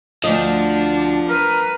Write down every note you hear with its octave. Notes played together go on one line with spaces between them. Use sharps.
D2 F3 D4 D#5
A#4 B4